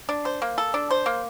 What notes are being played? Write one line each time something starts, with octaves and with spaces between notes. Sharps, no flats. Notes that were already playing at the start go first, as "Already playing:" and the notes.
D4
C5
A#3
A4
D4
C5
A#3